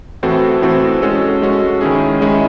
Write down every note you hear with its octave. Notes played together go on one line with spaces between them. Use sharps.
A2 E3 C4 F#4 A4
A2 E3 C4 F#4 A4
G#3 C#4 F#4 A4
G#3 C#4 F#4 A4
D#3 G#3 C#4 E4 G#4
D#3 G#3 C#4 E4 G#4